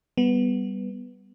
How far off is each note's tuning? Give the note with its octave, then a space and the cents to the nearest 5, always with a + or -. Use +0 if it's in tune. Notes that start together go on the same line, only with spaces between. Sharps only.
G3 +0 B3 +0